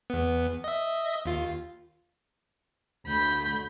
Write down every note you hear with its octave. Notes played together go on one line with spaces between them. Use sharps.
E2 B3
D#5 E5
D#2 F4
D2 B5 G6